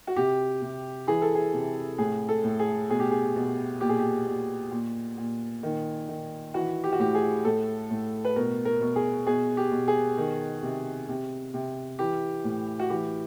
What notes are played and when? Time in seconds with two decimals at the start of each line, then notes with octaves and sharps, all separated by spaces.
0.07 F#4
0.16 C3 G4
0.62 C3
1.07 E3 G#4
1.22 A4
1.35 G#4
1.54 C3
1.98 A2 G#4
2.29 A4
2.44 A2
2.59 G#4
2.89 B2 G#4
3.00 G4
3.11 G#4
3.36 B2
3.81 A#2 G4
3.89 G#4
3.99 G4
4.27 A#2
4.71 A#2
5.18 A#2
5.63 D#3
6.09 D#3
6.54 E3 F#4
6.84 G4
6.93 F#4
6.99 A2 G4
7.15 G#4
7.45 A2 A4
7.91 A2
8.25 B4
8.36 B2 A#4
8.65 A#4
8.81 B2
8.96 G#4
9.27 B2 G#4
9.57 G4
9.72 B2
9.88 G#4
10.18 D#3
10.63 C3
11.08 C3
11.54 C3
11.99 E3 G4
12.44 A2
12.79 F#4
12.90 E3 G4